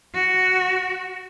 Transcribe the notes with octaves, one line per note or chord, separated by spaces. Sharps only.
F#4